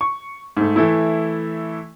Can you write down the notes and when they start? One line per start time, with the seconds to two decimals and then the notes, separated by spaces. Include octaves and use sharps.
0.01 C#6
0.57 G#2 A3
0.76 E3 A3 E4